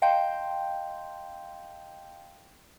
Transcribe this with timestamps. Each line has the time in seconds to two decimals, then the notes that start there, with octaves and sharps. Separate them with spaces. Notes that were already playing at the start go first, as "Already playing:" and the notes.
0.02 D#5 F5 G5 A5 C6 G6